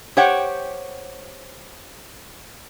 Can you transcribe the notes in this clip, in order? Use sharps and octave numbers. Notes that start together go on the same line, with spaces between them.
G4 C5 C#5 F#5 G5